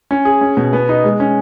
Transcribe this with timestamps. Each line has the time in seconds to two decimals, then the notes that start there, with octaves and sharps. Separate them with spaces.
0.11 C#4
0.25 G#4
0.41 C#4
0.57 B2
0.73 B3
0.89 D#4
1.04 G#3
1.20 C#4